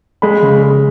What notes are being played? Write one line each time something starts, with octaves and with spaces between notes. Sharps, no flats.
G#3 B5
C#3
G#3